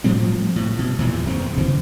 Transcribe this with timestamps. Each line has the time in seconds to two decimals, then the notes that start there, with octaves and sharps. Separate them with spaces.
0.04 A2 F3 G3 C4
0.56 A2
0.79 B2
0.98 E2 A#2 D#3 E3
1.27 E2 D#3 C4
1.57 D2 C#3 E3 C4